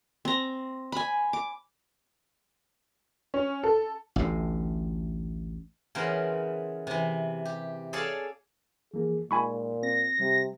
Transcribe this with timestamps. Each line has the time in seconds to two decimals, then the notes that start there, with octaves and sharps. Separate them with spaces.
0.25 C4 A#5
0.92 G#5 B5
1.33 D6
3.34 C#4
3.63 A4
4.16 A1 D2 A2
5.95 C#3 E3 B3 A#4 C5
6.87 C3 E3
7.45 G4
7.93 G#4 A4 C#5 D5 F5 A5
8.94 E3 F3 A#3 G#4
9.31 A#2 G#3 D#4 G#5 B5 C#6
9.83 C4 A#6
10.20 C3 G3